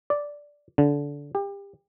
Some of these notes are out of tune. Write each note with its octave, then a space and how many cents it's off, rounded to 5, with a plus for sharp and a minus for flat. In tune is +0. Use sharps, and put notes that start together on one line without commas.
D5 -5
D3 -25
G4 +30